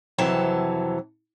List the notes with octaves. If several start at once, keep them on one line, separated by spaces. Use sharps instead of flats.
F2 C3 E3 F#3 A5